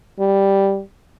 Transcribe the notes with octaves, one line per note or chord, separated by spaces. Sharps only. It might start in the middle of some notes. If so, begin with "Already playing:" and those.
G3